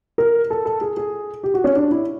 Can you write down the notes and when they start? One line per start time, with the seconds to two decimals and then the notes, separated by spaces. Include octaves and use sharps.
0.18 A#4
0.50 A4
0.65 A4
0.81 G#4
0.97 G#4
1.43 G4
1.54 F#4
1.64 C#4
1.76 D4
1.91 E4